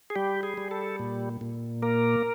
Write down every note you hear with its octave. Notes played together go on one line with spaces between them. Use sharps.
G#4
G3 G4
G#4
G3
A4
A#2
A#2
A#3 A#4